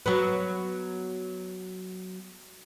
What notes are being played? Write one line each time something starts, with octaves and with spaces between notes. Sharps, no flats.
F#3 B3